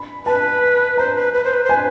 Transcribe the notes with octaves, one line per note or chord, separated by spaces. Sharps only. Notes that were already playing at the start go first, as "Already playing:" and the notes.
Already playing: B5
B4 A5
C5 A#5
B4
B4
C5
B4
C5
B4 G#5